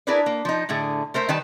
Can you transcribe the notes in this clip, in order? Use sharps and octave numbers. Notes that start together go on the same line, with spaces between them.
D4 E4 G#4 A#4 B4 D5
A#3
F3 D#4
A2 D3 A3 G#4
A3 A#4 C5 E5
D#3 G3 B4 G5 A5